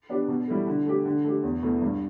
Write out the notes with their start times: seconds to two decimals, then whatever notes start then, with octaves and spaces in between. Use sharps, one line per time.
0.09 B3 D4 G4
0.28 B2
0.48 G3 E4 A4
0.67 D3
0.86 A3 G4
1.05 D3
1.24 A3 G4
1.43 E2
1.62 B2 A3 E4
1.82 G2